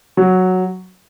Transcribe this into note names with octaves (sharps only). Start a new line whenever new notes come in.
F#3